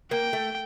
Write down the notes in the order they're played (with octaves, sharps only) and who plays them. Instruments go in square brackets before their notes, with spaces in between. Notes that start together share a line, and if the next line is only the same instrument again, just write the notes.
[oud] A#3 [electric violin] G5
[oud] A3